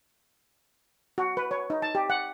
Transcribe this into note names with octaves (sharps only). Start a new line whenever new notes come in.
F#4
B4
C#5
D#4
A5
G4
F#5